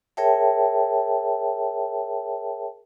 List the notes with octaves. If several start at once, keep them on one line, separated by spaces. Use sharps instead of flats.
G#4 A#4 C#5 E5 G5 A5